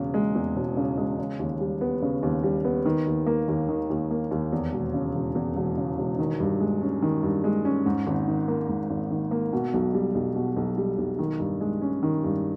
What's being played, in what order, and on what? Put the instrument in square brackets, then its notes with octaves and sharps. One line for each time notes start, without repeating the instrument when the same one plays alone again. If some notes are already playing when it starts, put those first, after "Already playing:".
Already playing: [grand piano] E1 E2 C#3
G#3
E2
E1
C#3
G#3
C#3
D#2
G3
B3
C#3
D#2
G3
B3
D#3
D#2
A#3
D#2
D#3
D#2
A#3
D#2
E2
E1
C#3
E1
E2
E1
C#3
E1
D#3
G2
G#3
C#4
D#3
G2
G#3
C#4
G#2
G#1
D#3
A#3
G#2
G#1
D#3
A#3
B2
B1
G3
B1
B2
B1
G3
B1
D#3
G2
G#3
C#4
D#3
G2